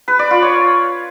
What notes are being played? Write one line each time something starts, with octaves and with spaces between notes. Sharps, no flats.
B4
D5
F4
C#5